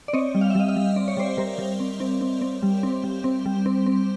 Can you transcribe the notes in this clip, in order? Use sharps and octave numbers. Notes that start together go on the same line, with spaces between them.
D5
C4 C#5 D#5
G3
F5
E5
G3 D#5 F5
D#5 F5
G3
C4 D5
C#5
G3 C5 D5
G3 A#4 C5
G3
C4
C4
C4
C4
G3
C4
G3
C4
G3
C4
C4